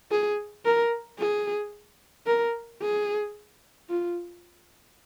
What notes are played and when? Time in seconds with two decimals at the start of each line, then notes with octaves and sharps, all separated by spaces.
0.11 G#4
0.65 A#4
1.19 G#4
2.27 A#4
2.82 G#4
3.89 F4